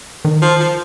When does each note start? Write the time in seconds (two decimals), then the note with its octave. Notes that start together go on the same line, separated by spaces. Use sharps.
0.25 D#3
0.42 F3
0.60 F3